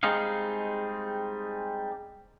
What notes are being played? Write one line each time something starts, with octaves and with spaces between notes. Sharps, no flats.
G3 G#3 C4 D#4 G#4 F5